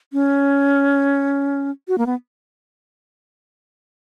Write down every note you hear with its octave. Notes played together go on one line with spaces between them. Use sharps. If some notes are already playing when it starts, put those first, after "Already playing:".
C#4
F#4
A#3
B3